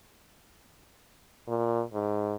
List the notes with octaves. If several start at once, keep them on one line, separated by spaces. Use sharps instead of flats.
A#2
G#2